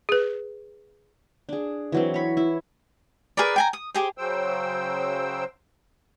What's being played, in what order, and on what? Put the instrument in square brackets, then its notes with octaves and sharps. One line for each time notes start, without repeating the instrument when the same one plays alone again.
[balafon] G#4 B4
[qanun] D4 G#4
E3 F#3 C4
C#5 B5
E4
[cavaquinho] G#4 A#4 B4 D5
G5 G#5 A#5
D#6
G4 G#4 C5
[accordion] C#3 F#3 C5 G5 E6